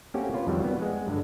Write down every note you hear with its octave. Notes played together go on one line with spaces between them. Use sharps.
A3 A#3 C4 C#4 F#4 G4
F4 B4 C#5
F2 D#3 F#3 G3 D5
G3 B3
G#3 F#5
G2 D3